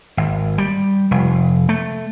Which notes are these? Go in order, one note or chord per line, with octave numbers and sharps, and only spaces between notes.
G#1
G3
F1
A3